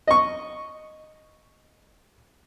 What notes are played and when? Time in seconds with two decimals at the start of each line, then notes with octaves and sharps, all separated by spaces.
0.08 D#5 C#6